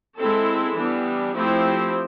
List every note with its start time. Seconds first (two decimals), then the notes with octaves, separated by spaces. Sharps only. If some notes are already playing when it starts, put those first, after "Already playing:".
0.18 G#3 C4 E4 A4
0.77 E3 G3 B3 D4
1.35 F3 A3 C4 E4 G4